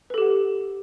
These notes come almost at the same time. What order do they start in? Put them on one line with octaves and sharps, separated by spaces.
B4 A4 G4 F#5